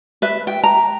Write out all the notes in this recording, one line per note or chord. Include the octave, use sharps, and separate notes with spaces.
B4 E5
G5
A#5